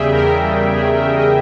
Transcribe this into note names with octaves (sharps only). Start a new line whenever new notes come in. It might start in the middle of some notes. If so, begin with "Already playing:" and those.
Already playing: E2 C#3 G3 G#4 E5 G5
E2 A#4
C#3 G3
E2 G#4
A#4
C#3 G3
D#5